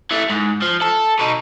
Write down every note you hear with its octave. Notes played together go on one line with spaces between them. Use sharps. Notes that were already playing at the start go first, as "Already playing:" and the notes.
E3 A3
G#2
F3
A4
B2 D#4